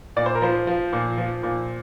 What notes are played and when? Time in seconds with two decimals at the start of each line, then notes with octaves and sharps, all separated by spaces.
0.16 A#2 D5
0.26 C5
0.35 A#4
0.42 F3 C5
0.67 F3
0.93 A#2
1.18 F3
1.43 A#2